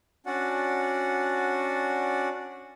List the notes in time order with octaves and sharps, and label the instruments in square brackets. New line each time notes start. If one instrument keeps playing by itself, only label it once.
[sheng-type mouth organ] C#4 D4 F#4 D5 F#5